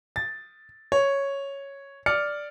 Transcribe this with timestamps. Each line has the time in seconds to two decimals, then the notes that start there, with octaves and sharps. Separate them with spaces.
0.16 A6
0.92 C#5
2.06 D5 F6 C#7